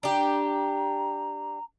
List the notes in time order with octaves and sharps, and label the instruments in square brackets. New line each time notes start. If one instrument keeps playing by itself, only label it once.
[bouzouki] D4 G4 [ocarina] A#5